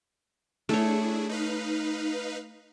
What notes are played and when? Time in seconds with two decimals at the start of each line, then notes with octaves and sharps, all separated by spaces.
0.69 A3 D4 E4 G#4 C#5
1.29 D#4 B4 F5